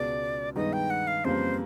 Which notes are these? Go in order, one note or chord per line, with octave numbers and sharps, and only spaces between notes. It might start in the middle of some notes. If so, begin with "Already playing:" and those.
Already playing: C#2 B2 G#3 D5
G2 D#3 G#3 B3 D#4 D#5
G5
F#5
F5
F2 C#3 E3 G3 A#3 C5